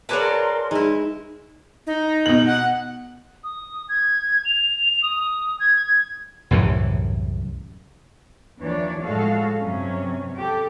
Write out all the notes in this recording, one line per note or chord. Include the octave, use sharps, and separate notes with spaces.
F#4 G#4 A#4 B4 C#5 D5 A5 C6
G#3 D#4 E4
D#4
B2 F#7
F#5
D#6
G#6
F7
D#6
G#6
G#6
C2 F#2 A2 E3
D#2 E3 F3 D4 C#5 D5
A2 F3 G#3 F#4 A4 F5
G2 C3 F#3 C#4
G4 A4